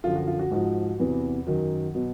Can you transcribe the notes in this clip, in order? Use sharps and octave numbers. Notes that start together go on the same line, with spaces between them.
F#2 D3 F3 F4
F#4
F4
F#4
G#2 F3 F#4
E2 C3 E3
F#2 D#3 F#3
B2 F#3